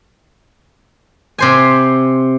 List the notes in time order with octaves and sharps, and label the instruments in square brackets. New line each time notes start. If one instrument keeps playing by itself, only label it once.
[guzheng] C3 C5 G#5